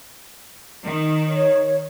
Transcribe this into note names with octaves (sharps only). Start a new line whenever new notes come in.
D#3
C#5